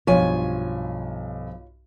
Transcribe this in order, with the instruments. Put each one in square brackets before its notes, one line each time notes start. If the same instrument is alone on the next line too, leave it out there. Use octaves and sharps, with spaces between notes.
[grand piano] B1 G2 [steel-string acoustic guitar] F3 G#5 [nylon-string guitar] F4 C#5